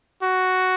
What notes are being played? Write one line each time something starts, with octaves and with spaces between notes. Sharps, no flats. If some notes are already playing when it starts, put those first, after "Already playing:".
F#4